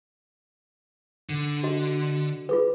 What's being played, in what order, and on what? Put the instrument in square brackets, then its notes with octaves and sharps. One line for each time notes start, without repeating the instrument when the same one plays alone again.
[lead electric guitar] D3
[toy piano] F#4 D#5
F4 G#4 B4